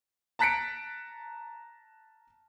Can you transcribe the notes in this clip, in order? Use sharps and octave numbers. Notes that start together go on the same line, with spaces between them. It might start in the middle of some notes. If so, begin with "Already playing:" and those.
A5 A#5 F#6 B6 C#7 D7